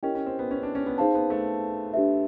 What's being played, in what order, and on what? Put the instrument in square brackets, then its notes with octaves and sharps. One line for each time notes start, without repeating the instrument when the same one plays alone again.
[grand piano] C#4 [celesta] E4 G4 A#4 D#5 G5
[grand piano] C#4
C4
B3
C#4
D4
C#4
B3
[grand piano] C4 [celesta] D#4 G#4 C5 F5 A5
[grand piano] B3
A3
[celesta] D4 G4 B4 E5